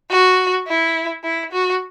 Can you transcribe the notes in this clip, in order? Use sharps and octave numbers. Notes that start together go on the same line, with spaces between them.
F#4
E4
E4
F#4